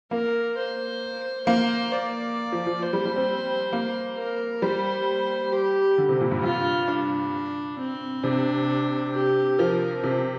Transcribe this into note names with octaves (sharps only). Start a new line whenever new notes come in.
A#3 A#4
C5
A#3 C5
D5
F3
F3
C5
G3
G3
C4
A#3
A#4
G3 C5
G4
D3
C3
A#2
G2
G2 F4
D4
C4
C3 D4
G4
F3 A#4
C3